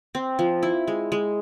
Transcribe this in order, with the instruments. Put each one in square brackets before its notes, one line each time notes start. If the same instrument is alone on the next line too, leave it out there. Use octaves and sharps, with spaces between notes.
[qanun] C4
F3
E4
G#3
G#3